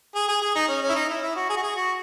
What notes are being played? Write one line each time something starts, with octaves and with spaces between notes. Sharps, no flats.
G#4
G#4
G#4
D#4
C#4
C#4
E4
D#4
E4
E4
F#4
G#4
F#4
G#4
F#4